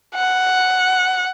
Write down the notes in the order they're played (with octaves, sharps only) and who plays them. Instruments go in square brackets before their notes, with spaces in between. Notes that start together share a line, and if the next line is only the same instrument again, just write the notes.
[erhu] F#5